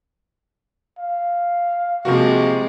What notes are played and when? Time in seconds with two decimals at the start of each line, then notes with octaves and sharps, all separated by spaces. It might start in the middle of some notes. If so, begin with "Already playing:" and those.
0.98 F5
2.05 C3 F3 G#3 A#3 F#4